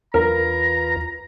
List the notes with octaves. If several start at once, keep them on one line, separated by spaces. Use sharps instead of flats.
E2 F4 A#4 B4 A#5